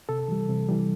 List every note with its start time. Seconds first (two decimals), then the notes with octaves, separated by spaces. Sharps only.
0.09 C3 A4
0.28 E3 G3
0.49 C3
0.69 E3 G3